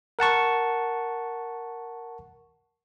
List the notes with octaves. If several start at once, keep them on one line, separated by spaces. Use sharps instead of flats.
A#4 F#5 A5 C#6